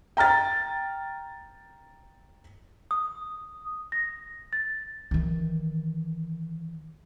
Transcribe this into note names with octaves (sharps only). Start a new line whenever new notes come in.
G5 A#5 F6 A6
D#6
A#6
A6
D#3 E3